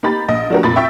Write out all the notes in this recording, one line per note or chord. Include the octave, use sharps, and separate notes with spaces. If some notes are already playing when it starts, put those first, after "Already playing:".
A#3 D#4 G4 B5 A6
A#1 D#5 A#6
F3 A3 D4 F#4 G4 A#4
F1 A#2 B5 A6
E5 G5 C#6 E6 B6